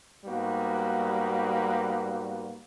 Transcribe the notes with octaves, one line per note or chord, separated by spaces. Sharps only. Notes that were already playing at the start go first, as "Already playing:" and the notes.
G#2 G3 A#3 B3 F#4